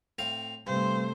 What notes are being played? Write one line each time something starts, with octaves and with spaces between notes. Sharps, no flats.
A2 C4 F5
G2 C3 A3 C5